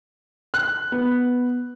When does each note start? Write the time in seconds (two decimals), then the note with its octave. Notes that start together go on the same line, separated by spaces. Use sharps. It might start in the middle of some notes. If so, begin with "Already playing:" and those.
0.54 F#6
0.92 B3